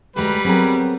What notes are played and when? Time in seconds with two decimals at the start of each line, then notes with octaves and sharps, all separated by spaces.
0.16 D2 G3 G#3 B4 A#5
0.45 F#3 B3 C4 G#4 A#4 C5